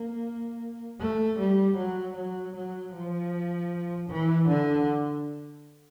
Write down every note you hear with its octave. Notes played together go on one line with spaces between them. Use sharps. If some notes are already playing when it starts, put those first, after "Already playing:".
Already playing: A#3
A3
G3
F#3
F#3
F#3
F3
E3
D3